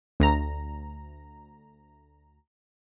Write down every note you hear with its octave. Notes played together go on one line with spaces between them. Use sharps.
D2 A#5